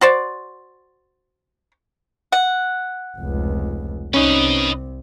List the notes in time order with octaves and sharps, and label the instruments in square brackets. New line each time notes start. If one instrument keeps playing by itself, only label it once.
[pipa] F#4 C5 D5
[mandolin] F#5
[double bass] F1 C#2
[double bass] C2 C3 [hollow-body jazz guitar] C#4 D#4 [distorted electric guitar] B4 D#5